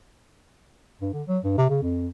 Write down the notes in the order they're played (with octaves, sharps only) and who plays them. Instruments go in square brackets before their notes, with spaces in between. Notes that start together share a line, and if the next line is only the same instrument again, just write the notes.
[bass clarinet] G2
D3
F#3
G2
C3
C#3
F2